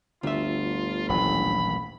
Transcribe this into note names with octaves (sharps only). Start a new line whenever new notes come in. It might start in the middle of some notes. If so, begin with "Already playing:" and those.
G1 D2 F4 E5
D#1 A1 F#3 B5